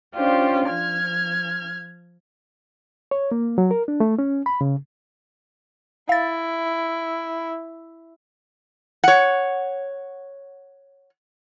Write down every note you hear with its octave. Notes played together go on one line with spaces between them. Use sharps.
C#4 D4 F4 G4 C5
F3 F6 G#6
C#5
A#3
F#3
A#4
D4
A3
C#4
B5
C#3
E4 F5 A6
C#5 F#5